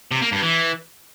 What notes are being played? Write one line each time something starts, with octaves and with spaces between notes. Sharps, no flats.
C3
A#3
G2
E3